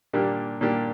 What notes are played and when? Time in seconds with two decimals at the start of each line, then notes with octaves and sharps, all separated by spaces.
0.13 A#2 G3 A#3 D4 G4
0.61 A#2 G3 A#3 D4 G4